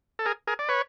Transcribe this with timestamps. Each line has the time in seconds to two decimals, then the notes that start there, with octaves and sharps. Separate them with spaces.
0.19 A4
0.26 G#4 A#4
0.47 G#4 A#4
0.59 D5
0.69 B4 C#5